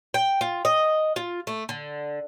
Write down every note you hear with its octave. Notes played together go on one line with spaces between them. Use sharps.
G5
F4
D#5
F4
A3
D3